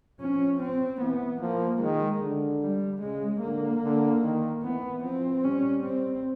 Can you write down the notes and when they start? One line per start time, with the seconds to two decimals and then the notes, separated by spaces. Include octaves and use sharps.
0.20 F3 C#4
0.61 C4
1.01 E3 B3
1.41 F3 A#3
1.81 D#3 G#3
2.21 D3
2.62 G3
3.02 C#3 G#3
3.42 D3 A#3
3.83 D3
4.23 D#3
4.63 E3 B3
5.04 F3 C4
5.44 G3 C#4
5.84 C4